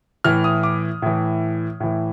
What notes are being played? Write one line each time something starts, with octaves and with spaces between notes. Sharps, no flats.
A2 E3 F6
D#6
D6
A2 E3
A2 E3